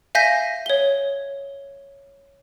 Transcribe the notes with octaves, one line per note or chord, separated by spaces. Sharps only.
E5 F5 G#5 G6 A#6 B6
C#5 G7